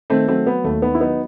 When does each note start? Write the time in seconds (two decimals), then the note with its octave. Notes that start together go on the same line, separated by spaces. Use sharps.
0.10 D#3 A3 C4
0.28 F#3 A3 C4
0.46 F#3 B3
0.64 D#2 A3
0.82 D#3 B3
0.95 E4
1.00 F#3 B3 D#4